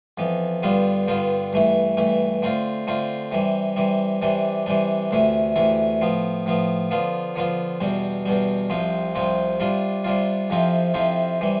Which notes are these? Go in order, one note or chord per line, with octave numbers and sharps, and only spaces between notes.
F2 E3 B3
G2 D3 G3 B3 F4
G2 D3 G3 B3 F4
G2 E3 A3 E4
G2 E3 A3 E4
D3 A3 C4 F4
D3 A3 C4 F4
C3 E3 G3
C3 E3 G3
C3 E3 G3 D4
C3 E3 G3 D4
D2 C3 E3 A3 E4
D2 C3 E3 A3 E4
A2 F3 B3
A2 F3 B3
D3 F3 B3 F4
D3 F3 B3 F4
E2 B2 G3
E2 B2 G3
C2 C3 F3 C4
C2 C3 F3 C4
C3 G3 D4 F4
C3 G3 D4 F4
F2 C3 F3 C4 E4
F2 C3 F3 C4 E4
C3 E3 G3